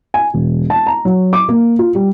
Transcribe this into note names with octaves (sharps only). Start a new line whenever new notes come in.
G#5
E1
A5
A#5
F#3
D6
A#3
F4
G3